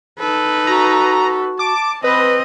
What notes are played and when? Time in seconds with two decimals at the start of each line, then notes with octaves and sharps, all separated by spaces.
0.19 D#4 A4 B4
0.67 F#4 A#5
1.59 A5 D6
2.04 C4 B4 D#5